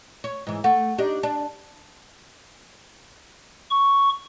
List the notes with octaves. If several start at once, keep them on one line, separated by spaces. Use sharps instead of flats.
C#5
G#2 E3
A3 F#5
D4 D#4 G4
D4 A5
C#6